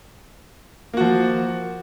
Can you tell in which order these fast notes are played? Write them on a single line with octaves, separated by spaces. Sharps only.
A#3 F#4 F3